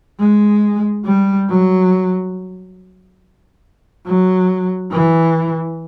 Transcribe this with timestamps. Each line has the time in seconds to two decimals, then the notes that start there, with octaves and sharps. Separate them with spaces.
0.19 G#3
1.06 G3
1.48 F#3
4.06 F#3
4.91 E3